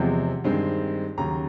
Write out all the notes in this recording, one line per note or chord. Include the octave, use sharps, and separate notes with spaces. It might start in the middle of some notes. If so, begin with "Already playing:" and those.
Already playing: E2 C3 F3 G#3 C4
G2 D#3 G#3 C4
D#2 C#3 F#3 A#5